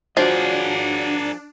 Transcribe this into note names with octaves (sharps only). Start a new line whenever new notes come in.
F3 D4 F#4 G#4 A#4 C#5 D#5